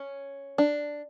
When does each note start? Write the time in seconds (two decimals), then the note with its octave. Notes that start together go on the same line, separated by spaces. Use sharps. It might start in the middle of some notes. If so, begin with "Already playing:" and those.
Already playing: C#4
0.58 D4